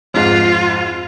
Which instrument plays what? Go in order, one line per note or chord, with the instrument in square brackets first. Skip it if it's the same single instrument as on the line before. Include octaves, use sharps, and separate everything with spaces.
[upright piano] F2 G#2 [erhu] F4